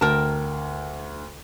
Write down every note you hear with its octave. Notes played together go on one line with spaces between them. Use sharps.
D2 A#4 G5 A5